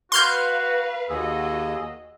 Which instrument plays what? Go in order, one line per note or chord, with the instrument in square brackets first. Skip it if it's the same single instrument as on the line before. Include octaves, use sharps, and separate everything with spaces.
[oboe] F#4 [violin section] B4 F5 [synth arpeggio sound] C6 F6 G6
[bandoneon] D#2 G#4 [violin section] F#4 D#5 [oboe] E6